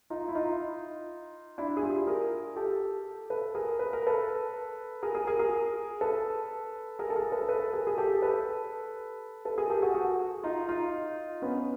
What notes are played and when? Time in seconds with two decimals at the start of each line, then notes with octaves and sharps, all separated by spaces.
0.10 D#4 F4
0.28 E4
0.35 D#4 F4
1.58 D4 E4
1.77 G#4
1.83 F4 G4
2.07 G#4 A#4
2.56 G4 A4
3.30 A4 B4
3.55 G#4 A#4
3.79 B4
3.93 A#4
4.07 A4 B4
5.03 G#4 A#4
5.15 G#4 A#4
5.27 G#4 A#4
5.39 G#4 A#4
6.01 A4 B4
6.99 G#4 A#4
7.10 A4
7.16 G#4 A#4
7.32 A4 B4
7.49 A4 B4
7.73 G#4 A#4
7.87 G#4
7.98 G4 A4
8.22 A4 B4
9.45 A4 B4
9.58 G#4 A#4
9.70 G4 A4
9.82 F#4 G#4
9.95 F#4 G#4
10.43 D#4 F4
10.69 D#4 F4
11.42 B3 C#4